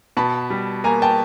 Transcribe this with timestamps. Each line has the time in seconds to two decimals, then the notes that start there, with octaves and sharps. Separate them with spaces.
0.17 B2 A5 B5
0.50 G3
0.84 A#3 G#5 A#5
1.02 G5 A5